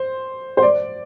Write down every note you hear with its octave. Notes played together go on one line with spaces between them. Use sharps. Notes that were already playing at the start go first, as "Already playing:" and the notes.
Already playing: C5
C5
D5